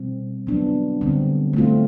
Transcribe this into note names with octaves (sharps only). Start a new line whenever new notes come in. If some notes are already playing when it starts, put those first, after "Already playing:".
Already playing: B2 G3 C4
F#3 B3 D4
D3 G3 C4
A3 C4 F4